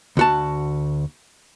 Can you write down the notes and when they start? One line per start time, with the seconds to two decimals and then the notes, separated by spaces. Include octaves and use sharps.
0.17 D2 F#4 A5